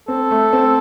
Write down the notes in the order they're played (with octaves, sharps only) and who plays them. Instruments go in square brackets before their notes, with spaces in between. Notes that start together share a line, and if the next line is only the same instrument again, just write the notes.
[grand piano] C4 [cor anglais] A4
[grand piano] A3
C4